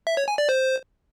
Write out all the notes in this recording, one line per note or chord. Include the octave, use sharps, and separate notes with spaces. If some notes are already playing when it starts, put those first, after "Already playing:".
E5
C#5
G#5
D5
C5